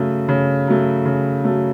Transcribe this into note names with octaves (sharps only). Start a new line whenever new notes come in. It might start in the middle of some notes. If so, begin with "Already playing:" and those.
Already playing: C#3 F#3 A3
C#3
F#3 A3
C#3
F#3 A3